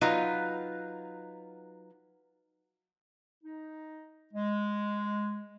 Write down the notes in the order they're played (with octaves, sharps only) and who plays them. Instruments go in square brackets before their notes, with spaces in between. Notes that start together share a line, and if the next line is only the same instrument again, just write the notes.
[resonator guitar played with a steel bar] F#3 D#4 F4 B4
[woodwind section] D#4
G#3